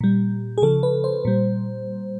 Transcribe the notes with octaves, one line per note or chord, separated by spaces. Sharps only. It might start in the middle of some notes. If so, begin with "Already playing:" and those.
A#2 G3
G#4
C#3 F3 A4
B4
C5
A#2 G3